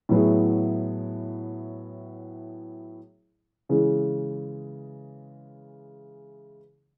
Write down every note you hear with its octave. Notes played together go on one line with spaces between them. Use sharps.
A2 F#3 B3 E4 G#4
C#3 E3 G#3